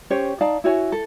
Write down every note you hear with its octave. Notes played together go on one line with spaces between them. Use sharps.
C#4 G4 C5 C#5
D#4 D5 F5 A5
E4 F#4 C#5 G#5
A4